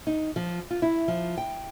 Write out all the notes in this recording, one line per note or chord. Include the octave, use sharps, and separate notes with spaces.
D#4
F3
F4
E4
F3
G5